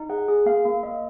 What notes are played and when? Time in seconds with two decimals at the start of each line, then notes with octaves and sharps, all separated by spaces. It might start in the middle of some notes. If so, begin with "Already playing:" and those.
Already playing: D#4
0.09 G#4 F#5
0.28 G#4
0.46 A#3 F5
0.65 A#3
0.83 A#3 D#5